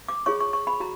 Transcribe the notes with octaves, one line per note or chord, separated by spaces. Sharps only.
D6
F4 G#4 C#5 C#6
C#6
C#6
B5
F#4 A#5